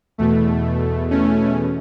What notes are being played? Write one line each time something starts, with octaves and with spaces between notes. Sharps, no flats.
E2 B2 A3
A3 C#4